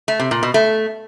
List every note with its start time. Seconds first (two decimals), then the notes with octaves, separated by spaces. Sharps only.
0.08 A3
0.20 C3
0.31 A#2
0.43 B2
0.54 A3